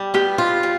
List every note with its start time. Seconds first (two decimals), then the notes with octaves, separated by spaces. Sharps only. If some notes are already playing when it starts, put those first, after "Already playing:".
Already playing: G3
0.14 B3 G4
0.38 F4
0.63 G3